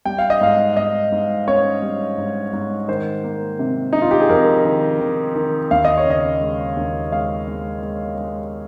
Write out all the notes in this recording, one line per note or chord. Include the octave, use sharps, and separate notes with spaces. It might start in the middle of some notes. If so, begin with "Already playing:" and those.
G3 G5
F5
D#5
G#2 F5
G#2 D#5
G#2
C#4 C#5
G3
G#2
G#2
D#3 C5
A#3
C3
C3 D#4
F4
G4
G#4
F2 A#4
D#3
D#3
D#3
D#2 F5
D#5
C#5
C#3 D#5
G#3
D#2
G#3 F5
G#3
G#3
G#3